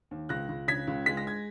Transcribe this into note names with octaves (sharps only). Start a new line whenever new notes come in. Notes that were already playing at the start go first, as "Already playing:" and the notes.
D#2
C#2 F#6 A#6
C#2
C#3 G#6 B6
C#2
G#3 B6
A#6
G#6